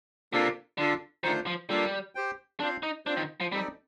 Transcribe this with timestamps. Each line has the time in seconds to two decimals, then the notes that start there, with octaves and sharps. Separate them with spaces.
0.33 C3 A#3 D4 F4 A4
0.78 D3 D4 F4 A4
1.24 D#3 A3 D4 F4 C5
1.46 F3
1.70 G3 A#3 D4 F4 A4
2.15 G4 C5 G5
2.60 C4 D4 F4 C5 F5
2.83 D#4
3.06 C4 D4 F4 C5
3.17 D#3
3.40 F3
3.52 G3 C4 D#4 A4 D5